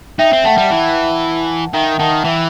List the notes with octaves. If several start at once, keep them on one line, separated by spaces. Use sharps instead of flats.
D#4 E5 G5
C4
A3 F#5 A5
G3
E3
D#3 E5 G5
D#3 F#5 A5
E3 E5 G5